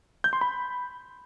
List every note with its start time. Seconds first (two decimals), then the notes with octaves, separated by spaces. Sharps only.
0.24 G6
0.33 C6
0.41 B5